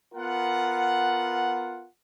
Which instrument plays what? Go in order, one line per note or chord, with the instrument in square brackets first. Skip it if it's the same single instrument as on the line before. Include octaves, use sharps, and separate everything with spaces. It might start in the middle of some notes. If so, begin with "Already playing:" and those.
[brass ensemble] B3 F4 A#4 F#5